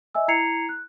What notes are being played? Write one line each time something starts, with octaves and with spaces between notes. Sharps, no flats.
D#5 E5 G#5 E6
E4 A#5 G#6 C7 C#7 F7
F#6